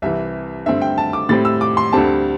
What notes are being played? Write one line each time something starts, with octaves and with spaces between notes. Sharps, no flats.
C2 C3 E3 E5
G2 D3 A3 C4 E5
G5
A5
D6
A2 G3 C4 A6
E6
D6
C6
D2 D3 G3 C4 A5